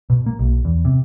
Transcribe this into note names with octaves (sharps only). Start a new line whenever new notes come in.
B2
A#3
B1
E2
C3